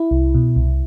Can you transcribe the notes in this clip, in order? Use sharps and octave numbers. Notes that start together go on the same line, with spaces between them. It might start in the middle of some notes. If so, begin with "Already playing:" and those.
Already playing: E4
C2
B2
C2